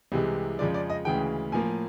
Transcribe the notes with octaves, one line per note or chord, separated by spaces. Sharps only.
C2 C3 E3 G#3
F2 C#3 F3 G#3 D5
D5
D#5
D2 C#3 E3 G#3 G5
A2 F3 A#3 G#5